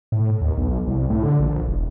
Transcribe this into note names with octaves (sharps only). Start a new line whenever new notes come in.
A2
D#2
B1
C2
A2
D3
A#1
E1